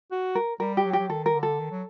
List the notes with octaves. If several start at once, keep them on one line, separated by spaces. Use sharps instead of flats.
F#4
A#4
G3 A#4
G4
F#3
G4
F#3
D#3 A4
A#4
D3
A4
D#3
F#3